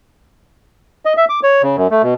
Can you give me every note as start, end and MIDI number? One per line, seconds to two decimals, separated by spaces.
1.05 1.13 75
1.17 1.25 76
1.29 1.40 86
1.43 1.62 73
1.62 1.76 49
1.76 1.87 42
1.91 2.02 57
2.02 2.14 47